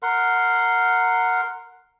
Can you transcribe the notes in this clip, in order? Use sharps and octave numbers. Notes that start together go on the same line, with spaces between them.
A#4 F#5 C6